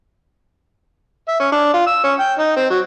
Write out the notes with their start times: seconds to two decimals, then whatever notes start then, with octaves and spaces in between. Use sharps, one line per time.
1.28 E5
1.40 C#4
1.52 D4
1.74 F4
1.87 E6
2.04 C#4
2.19 G5
2.39 D#4
2.56 C4
2.70 F#3